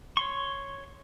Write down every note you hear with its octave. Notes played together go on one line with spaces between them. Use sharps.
C#5 C6 C#6